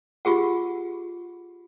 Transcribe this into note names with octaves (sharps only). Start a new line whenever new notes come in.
F4 G4 G#4 F#5